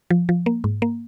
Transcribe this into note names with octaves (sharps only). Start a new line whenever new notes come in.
F3
F3
A#3
G#2
A#3